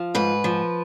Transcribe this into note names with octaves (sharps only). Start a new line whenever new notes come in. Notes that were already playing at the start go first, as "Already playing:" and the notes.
Already playing: F3
G#2 B4
F3